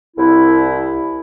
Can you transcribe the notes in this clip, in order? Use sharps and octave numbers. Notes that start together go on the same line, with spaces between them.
C2 E4